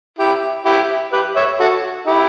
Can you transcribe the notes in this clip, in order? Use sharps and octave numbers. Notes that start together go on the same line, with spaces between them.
E4 G4
E4 G4
G4 B4
C#5 E5
F#4 A4
E4 G4